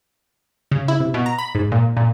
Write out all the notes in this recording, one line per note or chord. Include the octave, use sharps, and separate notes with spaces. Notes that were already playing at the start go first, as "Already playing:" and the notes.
C#3
E4
C3
B2
A#5
B5
G#2
A#2
A#2